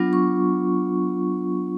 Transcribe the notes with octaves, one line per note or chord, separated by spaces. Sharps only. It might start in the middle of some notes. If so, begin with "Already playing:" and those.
Already playing: F#3 B3 D4 F4
C#6